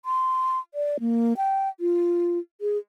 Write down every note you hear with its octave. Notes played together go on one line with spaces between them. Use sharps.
C6
D5
A#3
G5
F4
G#4